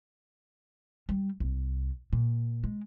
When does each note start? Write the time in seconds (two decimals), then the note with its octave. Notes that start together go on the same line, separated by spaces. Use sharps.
1.09 G3
1.40 C2
2.13 A#2
2.64 G#3